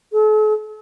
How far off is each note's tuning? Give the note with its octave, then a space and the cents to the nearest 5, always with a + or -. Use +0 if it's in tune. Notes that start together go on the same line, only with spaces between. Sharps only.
A4 -45